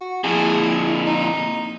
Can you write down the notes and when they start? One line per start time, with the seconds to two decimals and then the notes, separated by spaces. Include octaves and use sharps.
0.01 F#4
0.24 F2 A#2 E4 G#4
1.07 D#4